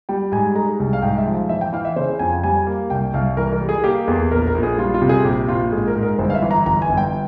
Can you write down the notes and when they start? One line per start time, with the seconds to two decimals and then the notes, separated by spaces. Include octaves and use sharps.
0.09 G3 G5
0.32 G#2 G#5
0.55 G#3 A#5
0.80 C2
0.93 F5
1.02 G#2 G5
1.18 E5
1.26 F3
1.49 E3 E5
1.61 G5
1.73 E3 F5
1.85 E5
1.96 C#3 C5
2.19 F2 G#5
2.44 G3 G#5
2.67 A#3
2.90 C2 G5
3.14 C2 F5
3.37 E3 A#4
3.52 A#4
3.61 G3
3.69 G#4
3.84 A#3 G4
4.08 E2 G#4
4.32 A#1 A#4
4.47 A#4
4.55 A#1
4.63 G#4
4.78 G3 F4
4.94 F4
5.02 C3
5.09 G#4
5.25 A#1 G4
5.48 A#1 F4
5.72 G#2 G#4
5.88 A#4
5.95 G#2
6.03 A#4
6.19 G1 C5
6.30 F5
6.35 E5
6.42 E3
6.51 A#5
6.66 G1 A#5
6.82 G#5
6.89 G1
6.97 G5